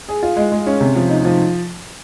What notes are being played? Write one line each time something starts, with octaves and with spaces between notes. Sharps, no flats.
G#4
F4
G#3
G#3
C#4
C3
F3
D#4
F3